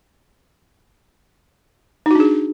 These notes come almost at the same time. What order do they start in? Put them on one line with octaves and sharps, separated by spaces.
D#4 F#4 D4 G#4